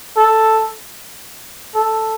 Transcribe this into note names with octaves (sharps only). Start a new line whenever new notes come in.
A4
A4